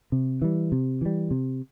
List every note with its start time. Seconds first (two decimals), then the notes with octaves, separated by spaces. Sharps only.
0.12 C3
0.42 E3 G3
0.72 C3
1.01 E3 G3
1.31 C3